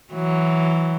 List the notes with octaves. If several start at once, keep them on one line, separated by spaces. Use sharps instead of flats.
E3 F#3